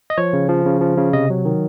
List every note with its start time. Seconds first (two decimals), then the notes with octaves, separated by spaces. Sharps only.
0.10 D#5
0.18 F3 C#5
0.33 C#3
0.49 F3
0.66 C#3
0.81 F3
0.98 C#3
1.13 C3 D#5
1.30 F#3
1.45 D#3